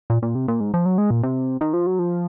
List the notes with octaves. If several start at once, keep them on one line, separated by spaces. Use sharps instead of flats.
A#2
A#2
C3
A#2
G#2
F3
F#3
G#3
A#2
C3
D#3
F3
F#3
F3